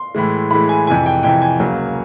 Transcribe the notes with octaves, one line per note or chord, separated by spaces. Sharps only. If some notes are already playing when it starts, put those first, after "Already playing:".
Already playing: C6
A2 E3 G#3
A2 E3 G#3 B5
G#5
F2 C3 E3 G#5
G5
F2 C3 E3 G5
G#5
C#2 C#3 F#3 A#3